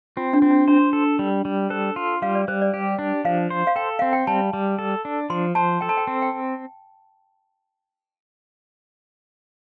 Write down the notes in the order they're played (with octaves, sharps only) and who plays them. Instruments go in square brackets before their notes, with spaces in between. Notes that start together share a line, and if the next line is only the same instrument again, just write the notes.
[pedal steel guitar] C4 [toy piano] F4
[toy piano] D4
[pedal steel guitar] C4
[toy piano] D4
[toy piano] D4 [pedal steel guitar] C5
[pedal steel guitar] A4
G3
G3
[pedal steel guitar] A4 [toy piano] C5
[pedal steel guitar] F4
[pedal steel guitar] G3 [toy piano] F5
[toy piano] D5
[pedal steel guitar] G3 [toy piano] C5
[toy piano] D5
[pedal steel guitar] G4
D4
[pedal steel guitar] F3 [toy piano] F5
[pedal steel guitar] C5
[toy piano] F5
[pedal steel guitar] A4 [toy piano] G5
[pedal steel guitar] C4 [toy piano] F5
[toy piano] G5
[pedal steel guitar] G3 [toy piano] A5
[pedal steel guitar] G3
A4
D4
[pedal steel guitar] F3 [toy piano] C6
[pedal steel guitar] C5 [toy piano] A5
[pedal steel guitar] A4 [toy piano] G5
[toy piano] A5
G5
[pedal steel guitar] C4
[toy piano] G5